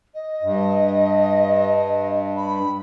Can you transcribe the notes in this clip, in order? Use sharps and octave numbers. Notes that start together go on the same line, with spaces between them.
D#5
G2
B5